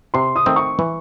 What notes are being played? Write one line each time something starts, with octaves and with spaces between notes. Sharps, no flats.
C3 C6
D#6
D#3 A3 C4
C#6
E3